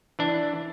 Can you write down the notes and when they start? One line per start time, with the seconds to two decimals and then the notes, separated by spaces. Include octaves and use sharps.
0.19 E3 D4